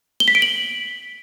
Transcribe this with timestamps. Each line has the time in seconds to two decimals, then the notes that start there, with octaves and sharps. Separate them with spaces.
0.20 G7
0.28 B6
0.35 D7
0.42 F#7